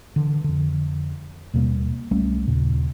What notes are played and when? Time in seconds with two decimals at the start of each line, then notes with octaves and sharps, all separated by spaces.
0.16 D3 E3
0.44 F2 D3
1.54 D#2 B2 G3 A#3
2.11 C2 G3 A3 C#4
2.48 D#2 A#2 C#3